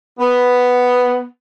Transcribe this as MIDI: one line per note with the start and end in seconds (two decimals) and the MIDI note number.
0.19 1.24 59